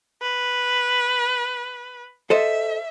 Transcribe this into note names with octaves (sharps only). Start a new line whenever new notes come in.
B4
A4 C5 D#5 E5